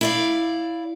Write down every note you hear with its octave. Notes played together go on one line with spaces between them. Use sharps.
E4 D5 F5